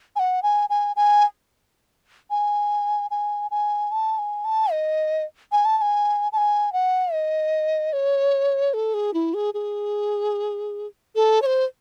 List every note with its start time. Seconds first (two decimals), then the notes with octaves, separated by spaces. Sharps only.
0.16 G#5
0.19 F#5
0.43 G#5
0.70 G#5
0.96 G#5
2.30 G#5
3.11 G#5
3.51 G#5
3.91 A5
4.18 G#5
4.44 A5
4.71 D#5
5.52 G#5
5.65 A5
5.78 A5
5.81 G#5
6.32 A5
6.37 G#5
6.73 F#5
7.13 D#5
7.93 C#5
8.74 A4
8.94 G#4
9.14 E4
9.34 G#4
9.54 G#4
11.15 A4
11.42 C#5
11.46 C5